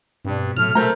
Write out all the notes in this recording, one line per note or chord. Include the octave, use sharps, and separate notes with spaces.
G2 B2 C4
A2 C3 F#3 F6
A#2 A3 A#4 C5 A#5 G6